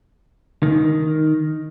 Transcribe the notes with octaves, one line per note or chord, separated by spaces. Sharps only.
D#3